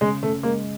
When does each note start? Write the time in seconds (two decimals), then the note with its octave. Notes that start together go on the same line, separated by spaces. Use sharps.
0.01 C#3 G#3
0.23 C#3 A3
0.43 G#3 A#3